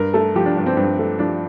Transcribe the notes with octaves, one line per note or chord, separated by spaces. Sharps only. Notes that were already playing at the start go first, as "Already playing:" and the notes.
Already playing: G2 A#4
A3 A4
F3 G4
D4
G2 D4
C4
G2 C4
A3
F3 D4